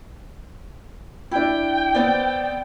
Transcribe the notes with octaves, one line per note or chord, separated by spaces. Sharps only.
D4 E4 G5
B3 C4 D5